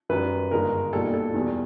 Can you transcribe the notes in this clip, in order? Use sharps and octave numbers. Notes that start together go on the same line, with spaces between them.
F#2 D#3 G3 B4
G1 G2 D#3 G#3 A#4
B1 A#2 G3 A4
A4
E2 B2 G3